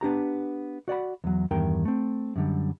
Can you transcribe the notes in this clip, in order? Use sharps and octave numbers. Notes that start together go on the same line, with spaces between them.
B3 D4 G4 A#5
F#4 D5 F#5 B5
E2 F#3
E2 G2 D#3 A#4 G5
A3 C4
F#2 D3 G3